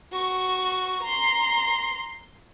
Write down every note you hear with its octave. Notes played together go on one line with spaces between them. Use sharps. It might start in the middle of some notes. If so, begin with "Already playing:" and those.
F#4 C#6
A#5 C6